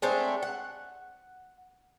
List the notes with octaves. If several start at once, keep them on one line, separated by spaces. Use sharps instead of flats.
G#3 A3 C4 D4
F#5